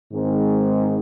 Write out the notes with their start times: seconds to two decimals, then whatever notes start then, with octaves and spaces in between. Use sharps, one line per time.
0.11 G#2 D#3 G#3 C4 D#4